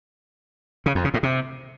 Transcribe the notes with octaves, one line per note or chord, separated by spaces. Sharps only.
C#3
F2
C#3
A2
C3